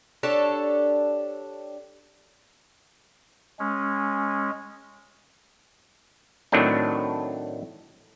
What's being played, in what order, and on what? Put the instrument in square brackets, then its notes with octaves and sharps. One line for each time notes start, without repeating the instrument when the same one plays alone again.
[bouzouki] D4 G4 A4 C#5
[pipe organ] G#3 C#4
[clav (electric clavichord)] A2 D#3 F#3 A3 C4 D4